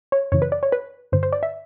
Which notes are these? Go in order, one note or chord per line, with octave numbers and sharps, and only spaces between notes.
C#5
F#2 C#3 E3 C#5
B4
D5
C#5
B4
G2 D3 C5
C5
D5
E5